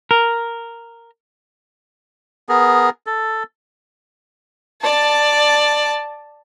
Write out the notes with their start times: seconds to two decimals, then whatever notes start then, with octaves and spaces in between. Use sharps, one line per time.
0.11 A#4
2.49 B3 G#4 A#4
3.06 A4
4.82 D5 A5